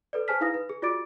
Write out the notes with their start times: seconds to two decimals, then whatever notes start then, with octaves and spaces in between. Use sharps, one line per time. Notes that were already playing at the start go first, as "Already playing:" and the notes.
0.13 A4 B4 D5
0.28 G#4 C5 G#5 A5 F6 B6
0.41 D#4 E4 B4 F5 D#6 A#6
0.54 B4
0.69 G#4
0.82 F4 F#4 D5 D6 A6 D7